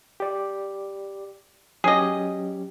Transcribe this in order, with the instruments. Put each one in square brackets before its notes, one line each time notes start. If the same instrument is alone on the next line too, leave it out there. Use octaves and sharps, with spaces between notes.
[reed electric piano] G4 D5
[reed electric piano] F#3 C#4 G4 [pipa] G#4 D#5